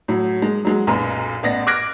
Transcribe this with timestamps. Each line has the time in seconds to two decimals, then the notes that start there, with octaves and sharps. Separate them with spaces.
0.08 A2 F#3
0.42 G#3
0.65 F#3 G#3
0.87 B1 F#2 A#2 B4 A#5
1.43 A1 B3 D5 A#6
1.67 D6 F6 F#6 G#6 A#6 D7